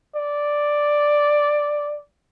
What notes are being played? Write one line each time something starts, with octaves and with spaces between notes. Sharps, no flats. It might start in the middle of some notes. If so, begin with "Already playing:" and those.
D5